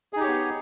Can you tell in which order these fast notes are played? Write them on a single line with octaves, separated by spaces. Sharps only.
G#4 D#4 G4 C#5 B3